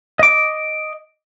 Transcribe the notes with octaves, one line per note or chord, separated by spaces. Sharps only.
D#5 D6